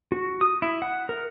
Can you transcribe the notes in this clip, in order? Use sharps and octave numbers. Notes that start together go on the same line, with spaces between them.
F#4
D#6
E4
F#5
A#4